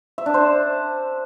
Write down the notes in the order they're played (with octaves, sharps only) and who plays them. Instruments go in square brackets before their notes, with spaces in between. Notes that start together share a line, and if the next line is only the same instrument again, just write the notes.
[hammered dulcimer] E5
D4
C5